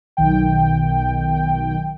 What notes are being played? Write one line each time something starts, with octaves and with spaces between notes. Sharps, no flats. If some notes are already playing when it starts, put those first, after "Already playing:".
B1 D#3 G5